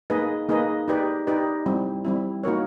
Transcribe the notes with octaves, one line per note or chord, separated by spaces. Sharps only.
A#3 D#4 G#4 B4 D#5
A#3 D#4 G#4 B4 D#5
D#4 G4 B4 D5
D#4 G4 B4 D5
G3 C4 E4
G3 C4 E4
A#3 D#4 F#4 A#4 C#5